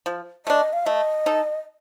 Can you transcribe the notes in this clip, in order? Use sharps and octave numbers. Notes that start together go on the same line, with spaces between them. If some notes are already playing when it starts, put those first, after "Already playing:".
F3
A3 D4 D#5
F5
A3 D#5
D#4 A4